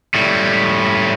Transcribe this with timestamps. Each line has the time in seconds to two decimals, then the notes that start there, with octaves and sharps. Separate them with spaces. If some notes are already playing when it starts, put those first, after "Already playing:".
0.14 A2 G3